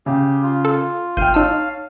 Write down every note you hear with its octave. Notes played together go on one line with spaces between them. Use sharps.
C#3 G4
F4
A4
G#1 F5 G5 G6 D#7
D#4 C#5 A5 E6